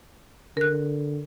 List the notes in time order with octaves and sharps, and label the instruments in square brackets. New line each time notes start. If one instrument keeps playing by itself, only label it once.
[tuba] D3 [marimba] A#4 F#6